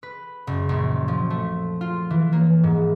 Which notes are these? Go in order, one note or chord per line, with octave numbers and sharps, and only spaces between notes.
B4
F#1
A#1
F3
A3
F4
E3
A#3
G#2